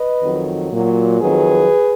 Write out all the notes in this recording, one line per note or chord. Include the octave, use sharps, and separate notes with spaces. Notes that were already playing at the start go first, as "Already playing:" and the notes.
Already playing: B4 D#5
F2 D#3 F#3
A#2 F#3
F2 D#3 F#3 G#4 B4